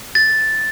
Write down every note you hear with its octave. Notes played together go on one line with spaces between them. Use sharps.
A6